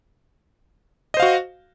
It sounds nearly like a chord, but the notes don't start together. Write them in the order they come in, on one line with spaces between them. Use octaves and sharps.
D#5 C5 F5 F#4